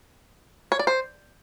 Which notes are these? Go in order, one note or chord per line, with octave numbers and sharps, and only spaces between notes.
C#5
D5
C5